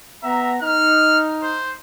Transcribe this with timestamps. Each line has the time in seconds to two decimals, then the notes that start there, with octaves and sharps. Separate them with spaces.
0.23 B3 E5 F#5 A#5
0.62 D#4 F6
1.42 C5